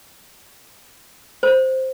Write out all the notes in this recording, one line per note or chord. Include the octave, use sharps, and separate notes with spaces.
C5